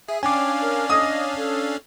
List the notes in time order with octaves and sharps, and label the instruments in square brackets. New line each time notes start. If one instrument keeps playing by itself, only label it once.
[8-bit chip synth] G#4 [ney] E5
[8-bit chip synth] C#4 D4 F5 [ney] G5 [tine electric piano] G#5 D6
[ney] A#4
[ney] D#5 [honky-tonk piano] D#6
[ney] A4